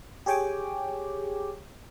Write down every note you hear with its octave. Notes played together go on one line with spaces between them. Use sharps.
G4 G#4 C#5 G5 G#5 D6